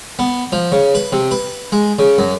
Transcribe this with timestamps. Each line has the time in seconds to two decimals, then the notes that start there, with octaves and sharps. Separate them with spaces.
0.19 B3
0.52 F3
0.72 C#3
0.95 B4
1.12 C3
1.31 B4
1.72 G#3
1.99 C#3
2.18 F#2